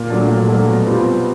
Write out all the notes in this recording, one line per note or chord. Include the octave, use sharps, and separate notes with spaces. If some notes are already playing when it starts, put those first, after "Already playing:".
Already playing: A#2
F#3 A3 D4
A#2
F#3 A3 D4
B2
G3 C4 F4
B2